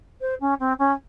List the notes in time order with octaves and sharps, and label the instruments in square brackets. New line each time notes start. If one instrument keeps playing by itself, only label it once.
[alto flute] C5
C#4
C4
C#4